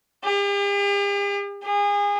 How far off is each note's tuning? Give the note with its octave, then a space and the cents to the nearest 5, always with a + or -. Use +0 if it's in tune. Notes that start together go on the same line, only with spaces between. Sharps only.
G4 +45
G#4 -30